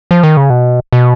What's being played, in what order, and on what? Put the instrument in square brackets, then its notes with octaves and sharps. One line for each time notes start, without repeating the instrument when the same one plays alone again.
[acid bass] F3
D#3
C#3
B2
B2